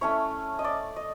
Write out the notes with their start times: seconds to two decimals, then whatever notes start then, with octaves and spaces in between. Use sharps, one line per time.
0.01 A3 C#4 E4 C#5
0.59 D#5
0.64 D5
0.96 D#5